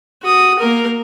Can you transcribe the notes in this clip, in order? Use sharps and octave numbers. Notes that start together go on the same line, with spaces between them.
F#4 D#6
A#3 A#4